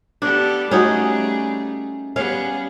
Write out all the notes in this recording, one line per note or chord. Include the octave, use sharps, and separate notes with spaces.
B3 D4 G4 A4
G3 A3 C#4 D#4 F#4 G#4
G3 B3 C#4 G#4 F5